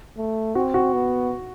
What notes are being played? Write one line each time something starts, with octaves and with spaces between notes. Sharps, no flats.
A3
C4 F#4
F#4
B3